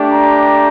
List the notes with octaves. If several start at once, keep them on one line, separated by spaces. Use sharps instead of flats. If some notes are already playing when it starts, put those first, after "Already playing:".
Already playing: A3 D4 G4
A#5